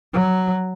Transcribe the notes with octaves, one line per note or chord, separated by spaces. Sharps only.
F#3